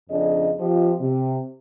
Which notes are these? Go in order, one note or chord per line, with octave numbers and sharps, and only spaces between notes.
F2 C#3 D4 G#4 D#5
F3 C4 F4 G4 D#5
C3